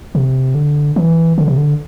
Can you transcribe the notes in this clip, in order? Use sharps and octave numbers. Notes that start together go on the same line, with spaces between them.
C3
D3
E3
D3
C3
D3